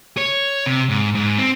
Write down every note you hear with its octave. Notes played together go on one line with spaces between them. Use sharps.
C#5
C3
G#2
G#2
C4